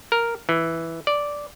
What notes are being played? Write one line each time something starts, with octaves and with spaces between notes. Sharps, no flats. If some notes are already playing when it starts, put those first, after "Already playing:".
A#4
E3
D5